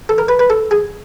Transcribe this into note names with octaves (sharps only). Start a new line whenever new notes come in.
A4
A#4
B4
B4
A4
G#4